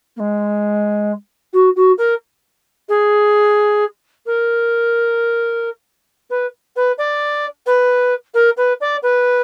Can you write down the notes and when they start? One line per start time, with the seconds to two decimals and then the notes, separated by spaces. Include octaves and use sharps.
0.16 A#3
0.19 G#3
1.53 F#4
1.76 F#4
1.98 A#4
2.88 G#4
4.26 A#4
6.30 B4
6.76 B4
6.98 D5
7.66 B4
8.34 A#4
8.57 B4
8.80 D5
9.02 B4